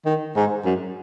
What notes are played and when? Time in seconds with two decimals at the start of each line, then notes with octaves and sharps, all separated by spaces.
0.06 D#3
0.36 G#2
0.65 F#2